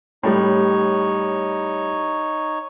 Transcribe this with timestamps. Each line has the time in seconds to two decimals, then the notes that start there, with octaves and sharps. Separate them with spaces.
0.23 A2 G3 D#4 C#5